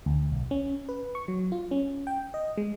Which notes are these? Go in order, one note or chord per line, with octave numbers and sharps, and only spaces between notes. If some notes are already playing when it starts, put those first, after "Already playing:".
D2
B1
C#4
B4
C#6
F#3
F4
C#4
G5
D#5
G#3